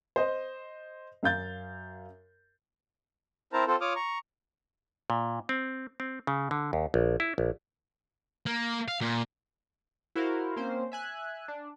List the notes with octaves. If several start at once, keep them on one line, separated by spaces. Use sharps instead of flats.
C5 D#5
F#2 F5 G6 A6
C4 E4 A#4 C5 A5 A#5
C4 F4 A4 C5
F4 C#5 D6 D#6 F6
A#5 C#6
A#2
C4
C4
C#3
D3
D#2
A#1
E4
A#1
A#3
F5
A#2
E4 F#4 A#4 C5 F5
A#3 C4 C#4 C5
E5 G#5 F#6
D4